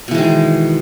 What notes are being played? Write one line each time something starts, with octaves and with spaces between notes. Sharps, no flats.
B2 D#3 E3 G#3